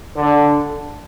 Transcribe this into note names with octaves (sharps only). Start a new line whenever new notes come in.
D3